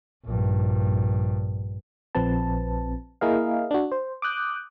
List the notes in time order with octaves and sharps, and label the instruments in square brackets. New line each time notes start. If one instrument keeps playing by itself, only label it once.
[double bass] A#1 G2
[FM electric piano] A#1 F3 C4 B4 A5
A#3 E4 G#4 A#4 D#5 F5
D4 F#4
C5
D6 D#6 F#6 G6